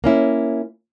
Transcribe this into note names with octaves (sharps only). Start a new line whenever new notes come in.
A#3 C#4 E4